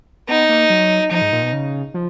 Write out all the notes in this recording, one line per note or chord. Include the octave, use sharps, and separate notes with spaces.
B3 D#4
A#3
F#3
F3 D#4
G#2
A#2
B2
C#3
F3